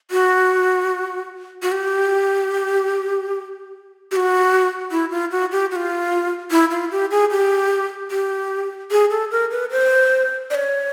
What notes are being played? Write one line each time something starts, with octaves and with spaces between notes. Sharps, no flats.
F#4
F#4
G4
G4
F#4
E4
F4
F#4
G4
F#4
F4
E4
F4
G4
G#4
G4
G4
G#4
A4
A#4
B4
C5
D5
C#5